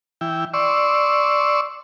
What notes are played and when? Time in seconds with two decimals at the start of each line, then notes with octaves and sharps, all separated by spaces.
0.21 E3 E4 G5
0.54 D5 C6 C#6 E6